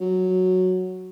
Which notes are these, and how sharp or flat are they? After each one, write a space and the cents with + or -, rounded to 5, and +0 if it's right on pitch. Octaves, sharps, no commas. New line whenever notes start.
F#3 -5